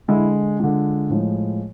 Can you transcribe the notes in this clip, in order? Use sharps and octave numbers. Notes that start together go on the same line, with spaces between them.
D3 G#3 E4
D3 G#3 F4
A2 F3 G#3